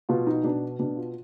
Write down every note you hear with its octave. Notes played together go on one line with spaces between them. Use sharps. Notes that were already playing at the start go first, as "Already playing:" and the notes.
B2 F4
D#4
B2 D4
B2 D4
F4